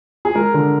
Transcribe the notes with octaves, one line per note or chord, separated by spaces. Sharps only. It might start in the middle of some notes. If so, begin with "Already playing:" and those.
G#4
G#3 A#4
D3